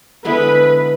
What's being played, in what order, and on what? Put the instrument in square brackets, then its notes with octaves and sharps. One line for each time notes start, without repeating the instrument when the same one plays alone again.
[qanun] D3 G#3 B3 E4 [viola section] B4